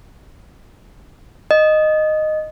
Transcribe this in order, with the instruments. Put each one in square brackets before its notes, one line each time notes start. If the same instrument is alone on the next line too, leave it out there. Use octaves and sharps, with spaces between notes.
[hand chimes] D#5